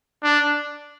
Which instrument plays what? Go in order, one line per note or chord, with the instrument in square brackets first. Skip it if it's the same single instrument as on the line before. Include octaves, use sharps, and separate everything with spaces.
[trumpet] D4